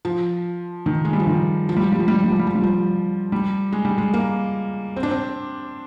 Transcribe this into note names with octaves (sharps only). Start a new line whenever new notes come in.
F3
D#3
G#3
G3
F3
D#3
F3
G3
F3
G3
F3
G3
F3
G3
F3
G3
F3
G3
F3
G3
G#3
G3
G#3
A#3
C4
D4
C4